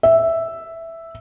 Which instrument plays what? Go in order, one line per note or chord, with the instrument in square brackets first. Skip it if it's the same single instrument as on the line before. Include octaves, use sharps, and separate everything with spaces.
[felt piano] E5